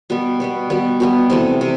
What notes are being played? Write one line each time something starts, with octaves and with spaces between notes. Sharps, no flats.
B2 G3 B3
B2 G3 B3
B2 G3 B3
B2 G3 B3
C3 E3 A3
C3